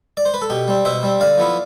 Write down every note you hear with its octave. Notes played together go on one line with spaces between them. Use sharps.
D5
C5
B4
A4
B2 G4
G3 C4
B2 C5 E5
G3 C4
D3 D5 F5
F3 B3 E4